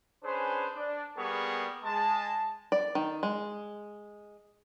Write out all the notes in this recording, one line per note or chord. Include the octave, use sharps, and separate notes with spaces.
C#4 D4 G#4 B4 C5
D4
G3 A#3 B3 G#4 A#4 C#6
G#3 A5
D5
D#3
G#3